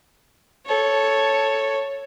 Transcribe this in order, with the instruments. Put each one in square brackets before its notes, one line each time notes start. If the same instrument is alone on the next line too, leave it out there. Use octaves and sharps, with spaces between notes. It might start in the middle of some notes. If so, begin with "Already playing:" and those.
[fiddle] A4 C#5